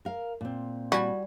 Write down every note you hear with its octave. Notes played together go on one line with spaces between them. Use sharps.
A#4 F5
A#2 C4
G3 F#4 G#5